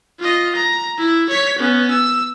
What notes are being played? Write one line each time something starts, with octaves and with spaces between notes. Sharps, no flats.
F4 D#5
A#5
E4
C#5 B6
B3 C#4
E6